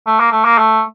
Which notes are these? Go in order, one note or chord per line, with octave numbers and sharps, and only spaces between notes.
A3
A#3
A3
A#3
A3